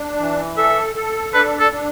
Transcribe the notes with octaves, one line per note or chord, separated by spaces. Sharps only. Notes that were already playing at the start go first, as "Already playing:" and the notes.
Already playing: D4
E3
A4 E5
A4
D4 B4
A4
D4